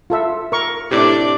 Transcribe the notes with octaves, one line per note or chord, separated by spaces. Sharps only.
F4 A4 E5
A#4 C#6
A2 C3 D4 D5